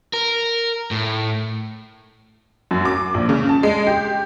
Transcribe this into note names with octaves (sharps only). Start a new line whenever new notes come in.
A#4
A2
F#2
D6
A#1
C#3
A5
G#3
G4